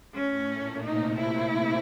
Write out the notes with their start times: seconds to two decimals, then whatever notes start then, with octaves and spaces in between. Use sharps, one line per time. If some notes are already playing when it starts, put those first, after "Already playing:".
0.14 A2 A3 C#4
0.49 A#2 A#3
0.82 C3 C4 D#4
1.17 E4